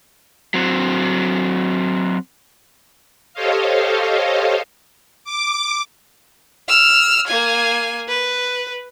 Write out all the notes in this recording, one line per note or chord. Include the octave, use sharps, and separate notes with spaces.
F#3 C4
G4 A4 C5 C#5 D#5 F5
D6
E6 F6
A#3 G#5
B4